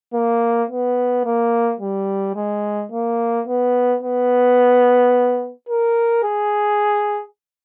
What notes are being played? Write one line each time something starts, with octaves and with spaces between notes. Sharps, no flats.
A#3
B3
A#3
G3
G#3
A#3
B3
B3
A#4
G#4